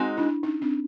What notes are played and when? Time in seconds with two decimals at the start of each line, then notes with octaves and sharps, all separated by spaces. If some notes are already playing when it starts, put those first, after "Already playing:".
Already playing: G#3 C4 D#4 F#4
0.17 D4 E4
0.43 C#4 D#4
0.62 C4 D4